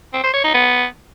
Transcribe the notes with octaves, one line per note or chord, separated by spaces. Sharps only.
C4
C5
C#5
D#4
B3